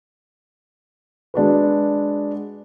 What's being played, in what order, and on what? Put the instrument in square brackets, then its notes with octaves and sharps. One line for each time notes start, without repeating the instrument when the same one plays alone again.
[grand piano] G#3 D4 F#4 B4